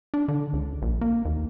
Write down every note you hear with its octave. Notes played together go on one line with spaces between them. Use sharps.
D4
D3
C#2
A#1
A#3
D#2